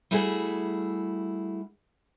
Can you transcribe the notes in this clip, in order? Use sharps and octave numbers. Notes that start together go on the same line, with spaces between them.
G3 A3 E4 F#4 G#4